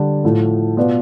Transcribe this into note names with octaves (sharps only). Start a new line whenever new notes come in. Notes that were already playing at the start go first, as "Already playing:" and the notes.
Already playing: D3 G3
A2 F3 A3
B2 B3 F4 B4 D5